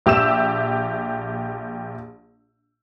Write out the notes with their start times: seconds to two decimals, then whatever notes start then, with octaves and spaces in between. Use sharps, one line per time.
0.06 A#1 G4 E5 E6 E7